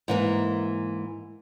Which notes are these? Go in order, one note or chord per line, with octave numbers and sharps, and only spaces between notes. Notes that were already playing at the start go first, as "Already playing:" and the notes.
G#2 E3 A#3